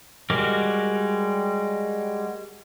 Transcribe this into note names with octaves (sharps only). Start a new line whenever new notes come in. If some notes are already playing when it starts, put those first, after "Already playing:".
G3 G#3 F#4 A#4 D6